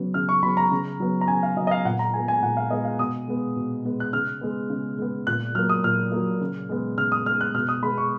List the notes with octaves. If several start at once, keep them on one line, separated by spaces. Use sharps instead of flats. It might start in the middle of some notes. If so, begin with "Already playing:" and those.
Already playing: C#3 F#3 B3
C#3 F6
C#6
F#3 B3 B5
A#5
C#3
F#3 B3
A#5
C#3 G#5
F5
F#3 B3 D#5
D#5
F5
A#2 F#5
A#5
G#3 B3 G#5
G#5
A#2 F#5
F5
G#3 B3 D#5
F5
B2 D#6
G#3 B3
B2
G#3 B3
F#6
C#3 F6
G#3 B3
C#3
G#3 B3
A#2 F#6
F#3 A#3 F6
D#6
A#2 F6
F#3 A#3
C#3
G#3 B3
C#3 F6
D#6
G#3 B3 F6
F#6
B2 F6
D#6
G#3 B3 B5
C#6